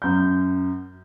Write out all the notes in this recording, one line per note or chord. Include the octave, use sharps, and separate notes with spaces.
F#2 G6